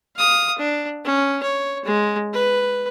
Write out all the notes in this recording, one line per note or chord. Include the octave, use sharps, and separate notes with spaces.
F5 D#6
D4
C#4
C#5
G#3
B4